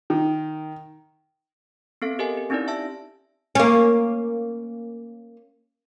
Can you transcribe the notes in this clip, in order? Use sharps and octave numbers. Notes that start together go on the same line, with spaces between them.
D#3
B3 C4 A4 F5
G4 A4 A#4 D#5 G#5
G4
C4 C#4 D#4 E4 G4 D5
E5 A5 E6 A#6
A#3 C#4